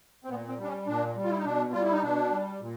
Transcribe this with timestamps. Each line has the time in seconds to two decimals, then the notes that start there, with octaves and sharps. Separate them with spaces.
0.25 C4
0.29 A#2 B3
0.48 C4
0.58 G3 D4
0.68 C#4
0.87 A#2 D4
1.16 G3
1.24 F4
1.30 E4
1.38 D#4
1.45 B2 D4
1.73 G3 F4
1.83 E4
1.93 D#4
2.03 B2 D4
2.32 G3
2.61 A#2